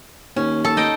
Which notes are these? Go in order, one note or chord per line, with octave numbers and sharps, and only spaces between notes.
D#2 C#4
A4
D#4 D#5 G5